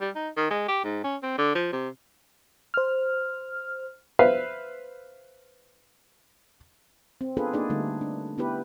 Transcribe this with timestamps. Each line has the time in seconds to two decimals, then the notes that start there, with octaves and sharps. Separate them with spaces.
0.01 G3
0.15 D#4
0.37 D#3
0.51 G#3
0.68 G4
0.84 G#2
1.04 C#4
1.23 C4
1.38 D3
1.55 F3
1.72 C3
2.74 C5 F6
4.19 B4 C5 E5 F5
7.21 C4
7.37 B3 D4 F4 G#4 A4 B4
7.53 A#3 D4 D#4 G#4 D5
7.70 D3 G3 A3 D#4
8.01 D4
8.38 B3 E4 G4 B4